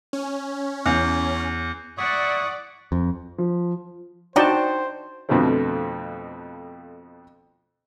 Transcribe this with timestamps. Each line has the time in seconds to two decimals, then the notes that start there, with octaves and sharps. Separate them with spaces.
0.13 C#4
0.86 E2
1.98 E4 D5 F#5 C#6 D#6
2.92 F2
3.38 F3
4.36 D4 D#4 F#4 C5 D5 G5 A5
5.29 F2 B2 D3 F3 A3 C4